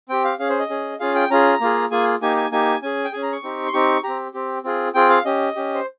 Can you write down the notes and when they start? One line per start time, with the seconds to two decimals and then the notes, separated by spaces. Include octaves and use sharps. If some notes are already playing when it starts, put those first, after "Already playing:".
0.09 C4 G4 G5
0.24 F5
0.39 C#4 G#4 F5
0.50 C5
0.59 D#5
0.70 C#4 G#4
1.00 C#4 F4 G#4 F5
1.15 G5
1.30 C#4 F4 G#4 A#5
1.61 A#3 F4 G#4
1.91 A#3 F4 G#4 G#5
2.22 A#3 D#4 G4 G#5
2.37 G#5
2.52 A#3 D#4 G4 G#5
2.82 C#4 G#4 G#5
3.04 G5
3.13 C#4 G#4 G#5
3.23 A#5
3.32 C#6
3.43 C4 D#4 G4
3.67 C6
3.73 C4 D#4 G4 C#6
4.03 C4 G4 A#5
4.34 C4 G4
4.64 C4 F4 G#4
4.94 C4 F4 G#4 G5
5.09 F5
5.25 C#4 G4 D#5
5.56 C#4 G4
5.74 C5